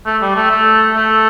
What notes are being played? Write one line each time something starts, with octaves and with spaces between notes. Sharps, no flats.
A3
G3
A3
A3
A3